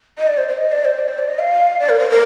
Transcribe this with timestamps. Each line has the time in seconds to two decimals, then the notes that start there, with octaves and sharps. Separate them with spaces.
0.18 D#5
0.27 D5
0.38 C5
0.48 C5
0.58 D#5
0.72 D5
0.85 C5
0.98 D5
1.08 C5
1.19 D5
1.28 D#5
1.39 F5
1.79 D5
1.89 A#4
1.99 C5
2.10 A#4